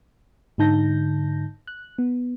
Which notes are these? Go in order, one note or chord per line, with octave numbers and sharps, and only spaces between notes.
G#2 D3 D#4 A5 G6 A#6
F#6
B3